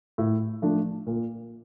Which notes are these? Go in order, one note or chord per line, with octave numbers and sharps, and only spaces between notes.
A2
F3 A3 D4
A#2